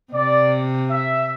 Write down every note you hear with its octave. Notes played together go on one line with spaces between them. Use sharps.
C3 D5
E5